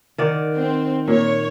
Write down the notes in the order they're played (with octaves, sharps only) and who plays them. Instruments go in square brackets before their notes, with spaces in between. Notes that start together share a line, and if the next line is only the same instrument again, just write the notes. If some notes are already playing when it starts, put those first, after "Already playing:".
[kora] D#3 D5 F#5
[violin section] C4
[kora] A#2 [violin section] C#5